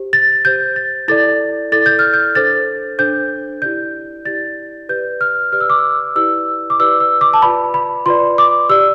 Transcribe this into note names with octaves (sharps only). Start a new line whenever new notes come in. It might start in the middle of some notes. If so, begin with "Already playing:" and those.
Already playing: G4 C5
A6
G4 C5 G6
A6
E4 A4 D5 A6
E4 A4 D5 A6
G6
F6
G6
D4 A4 C5 A6
D4 A4 C5 G6
E4 G4 D5 G6
E4 G4 D5 A6
G4 B4 D5 G6
F6
G4 B4 D5 F6
E6
D6
E6
E4 G4 B4 D5 E6
D6
E4 G4 B4 D5 E6
E6
D6
A5
F4 B4 D5 B5
B5
F4 B4 D5 C6
D6
G4 D5 E6